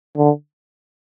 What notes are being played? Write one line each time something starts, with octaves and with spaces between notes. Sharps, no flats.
D3